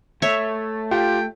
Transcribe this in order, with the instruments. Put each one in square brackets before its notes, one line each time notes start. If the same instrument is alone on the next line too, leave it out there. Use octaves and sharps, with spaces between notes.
[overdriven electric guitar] A3 [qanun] C#5 E5
[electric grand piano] F4 G4 [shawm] G5